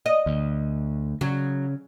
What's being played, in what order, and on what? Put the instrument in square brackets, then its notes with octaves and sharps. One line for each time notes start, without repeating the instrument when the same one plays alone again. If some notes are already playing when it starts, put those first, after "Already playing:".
[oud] D#5
[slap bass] D2
[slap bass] C#3 [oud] F#3